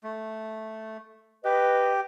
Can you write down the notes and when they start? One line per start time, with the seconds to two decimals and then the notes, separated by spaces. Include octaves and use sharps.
0.03 A3
1.45 G4 B4 D#5